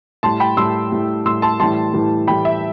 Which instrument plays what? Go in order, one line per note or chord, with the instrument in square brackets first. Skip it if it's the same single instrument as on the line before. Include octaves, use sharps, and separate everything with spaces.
[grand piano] A2 G3 A5 C6
G5 B5
A2 G3 C6 E6
A2 G3
A2 G3 C6 E6
A5 C6
A2 E3 G3 A5 C6
A2 E3 G3
A2 E3 G3 G5 B5
E5